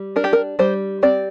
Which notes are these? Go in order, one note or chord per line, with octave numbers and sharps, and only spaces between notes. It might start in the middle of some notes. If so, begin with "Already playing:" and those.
Already playing: G3
D4 A#4
G4
A#4
G3 C5
C4 D5